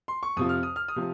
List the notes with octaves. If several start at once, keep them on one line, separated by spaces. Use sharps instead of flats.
C6
C#6
F2 C3 F3 D#6
F6
D#6
F6
D#6
C3 F3